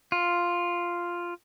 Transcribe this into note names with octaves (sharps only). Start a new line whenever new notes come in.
F4